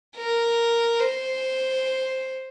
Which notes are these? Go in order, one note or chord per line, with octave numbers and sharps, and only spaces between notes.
A#4
C5